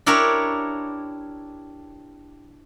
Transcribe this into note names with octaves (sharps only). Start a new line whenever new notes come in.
D4 E4 G4 A#4 C#5